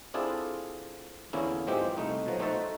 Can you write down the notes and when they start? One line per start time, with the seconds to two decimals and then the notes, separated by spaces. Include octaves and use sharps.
0.14 C4 D4 E4 F4 G#4 A4
1.33 E2 D3 A#3 C#4 E4
1.67 G#2 E3 F3 G#3 C4 G4
1.97 C2 A3 D#4
2.26 B2 F3 F#3
2.39 A3 D#4 F#4 C5 E5 A5